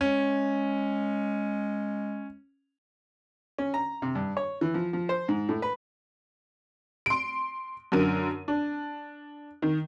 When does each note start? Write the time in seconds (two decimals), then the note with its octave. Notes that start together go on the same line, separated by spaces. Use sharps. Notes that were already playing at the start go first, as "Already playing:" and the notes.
0.01 G#3 C#4
3.58 C#4
3.74 A#5
4.02 C3
4.15 G2
4.37 C#5
4.61 E3
4.74 F3
4.93 F3
5.09 C5
5.29 G#2
5.49 A2
5.62 B4
7.06 C6 D7
7.92 F#2 D3 A#4 D#7
8.48 D4
9.62 D#3